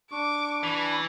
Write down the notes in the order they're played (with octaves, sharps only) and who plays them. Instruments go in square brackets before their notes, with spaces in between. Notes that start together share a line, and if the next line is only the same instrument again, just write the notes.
[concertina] D4 C#6 [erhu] D6
[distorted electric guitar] E3 [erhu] B5